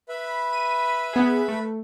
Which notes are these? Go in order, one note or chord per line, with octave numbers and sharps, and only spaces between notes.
B4 E5 B5
D#7
B3 G#4
A3